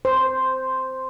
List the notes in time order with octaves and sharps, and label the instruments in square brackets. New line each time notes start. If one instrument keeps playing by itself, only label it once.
[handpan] C5